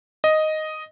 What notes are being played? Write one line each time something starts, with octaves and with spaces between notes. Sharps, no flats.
D#5